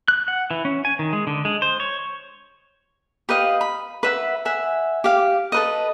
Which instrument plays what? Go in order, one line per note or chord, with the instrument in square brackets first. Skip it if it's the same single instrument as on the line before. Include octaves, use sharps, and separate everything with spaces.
[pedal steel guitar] F#6
F#5
E3
C#4
G#5
D#3
G#3
D3
G#3
C5
C#5
[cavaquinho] G4 B4 D#5 F5
B5
B4 E5 F#5
E5 F#5 G#5
G4 F5
A4 B4 D#5